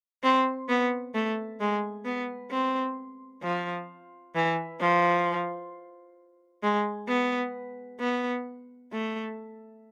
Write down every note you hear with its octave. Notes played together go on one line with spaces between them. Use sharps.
C4
B3
A3
G#3
B3
C4
F3
E3
F3
G#3
B3
B3
A3